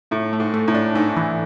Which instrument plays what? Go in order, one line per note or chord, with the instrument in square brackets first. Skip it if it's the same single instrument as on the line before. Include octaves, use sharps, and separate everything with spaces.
[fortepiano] A2 [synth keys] A3
[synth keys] A3
[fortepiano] G#2
[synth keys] A3
[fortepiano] A2
[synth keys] D4
[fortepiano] G#2 [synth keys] A3
[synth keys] E3